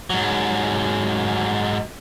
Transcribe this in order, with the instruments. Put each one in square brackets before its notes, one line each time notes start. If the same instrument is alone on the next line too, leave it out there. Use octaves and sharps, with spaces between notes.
[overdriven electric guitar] G#2 F#3